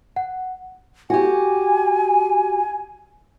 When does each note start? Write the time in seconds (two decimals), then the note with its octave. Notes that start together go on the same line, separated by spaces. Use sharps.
0.16 F#5
1.10 F#4 G4 G#5